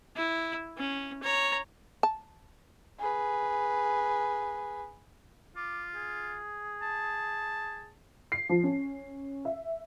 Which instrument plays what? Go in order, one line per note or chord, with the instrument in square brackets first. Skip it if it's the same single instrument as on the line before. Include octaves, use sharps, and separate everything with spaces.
[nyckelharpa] E4
C#4
C#5 A#5
[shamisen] A5
[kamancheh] G#4 B4
[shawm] F4 [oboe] D6
[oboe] G#4
[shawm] A5
[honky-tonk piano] C7
F3
C#4
E5